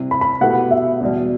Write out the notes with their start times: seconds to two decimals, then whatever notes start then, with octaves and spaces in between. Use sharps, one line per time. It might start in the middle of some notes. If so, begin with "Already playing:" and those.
Already playing: C3 G3 C4 E4
0.11 B5
0.21 B5
0.41 B2 A3 E4 G4 B4 F#5
0.71 E5
1.01 E2 B2 G3